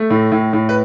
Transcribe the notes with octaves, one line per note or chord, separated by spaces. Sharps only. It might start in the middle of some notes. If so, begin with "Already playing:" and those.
Already playing: A3
A2
A2
A2
B4